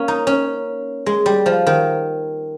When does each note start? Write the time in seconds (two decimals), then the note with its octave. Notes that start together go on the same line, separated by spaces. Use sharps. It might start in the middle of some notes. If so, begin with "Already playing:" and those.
Already playing: A#3 C#4
0.08 D#4
0.27 C#4
1.06 G#3
1.26 G3
1.46 F3
1.67 D#3